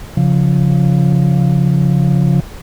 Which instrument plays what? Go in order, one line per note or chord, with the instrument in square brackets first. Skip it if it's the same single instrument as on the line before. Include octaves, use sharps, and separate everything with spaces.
[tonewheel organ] C#3 F3